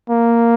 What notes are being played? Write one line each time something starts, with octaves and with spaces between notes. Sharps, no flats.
A#3